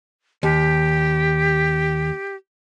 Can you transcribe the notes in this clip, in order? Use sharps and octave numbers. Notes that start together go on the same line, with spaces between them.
D#2 G4